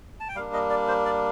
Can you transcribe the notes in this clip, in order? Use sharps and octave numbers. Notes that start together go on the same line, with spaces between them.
A5
G5
G3 A#3 D4 F5
D#5
D5
C5
D5